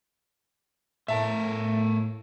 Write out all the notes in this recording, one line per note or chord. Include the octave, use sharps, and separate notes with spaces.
A2 A3 A#4 E5 A5